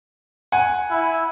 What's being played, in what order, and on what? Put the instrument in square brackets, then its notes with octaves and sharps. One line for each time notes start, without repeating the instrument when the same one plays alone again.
[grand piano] F#5 G#5
[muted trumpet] E4